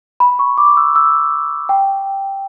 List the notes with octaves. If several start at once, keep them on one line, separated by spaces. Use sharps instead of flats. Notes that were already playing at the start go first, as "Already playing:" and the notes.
B5
C#6
D6
E6
E6
G5